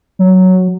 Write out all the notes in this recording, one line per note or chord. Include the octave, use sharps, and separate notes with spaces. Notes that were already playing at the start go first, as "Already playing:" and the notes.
F#3